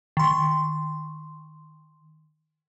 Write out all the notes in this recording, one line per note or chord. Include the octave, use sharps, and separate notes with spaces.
D#3 C6